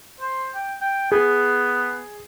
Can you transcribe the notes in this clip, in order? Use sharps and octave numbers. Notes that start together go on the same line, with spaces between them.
C5
G5
G5
B3 G#4